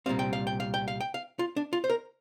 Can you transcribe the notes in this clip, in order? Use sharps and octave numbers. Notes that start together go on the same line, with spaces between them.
C2 A#2 G3 C4 F5
G5
F5
G5
F5
G5
F5
G5
F5
F4
D4
F4
C5
A#4